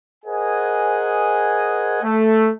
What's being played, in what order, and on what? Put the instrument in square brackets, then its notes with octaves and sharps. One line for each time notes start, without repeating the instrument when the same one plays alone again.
[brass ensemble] G#4 A#4 C5 D#5 F#5 G#5
A3